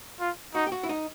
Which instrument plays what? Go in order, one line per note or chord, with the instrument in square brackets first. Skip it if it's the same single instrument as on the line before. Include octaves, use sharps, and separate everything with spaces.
[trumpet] F4
[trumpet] D#4 [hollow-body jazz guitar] F#4
[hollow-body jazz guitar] G4
F#4
E4
D#4